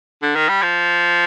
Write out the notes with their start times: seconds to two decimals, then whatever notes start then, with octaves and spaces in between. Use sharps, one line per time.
0.22 D3
0.36 D#3
0.49 G3
0.63 F3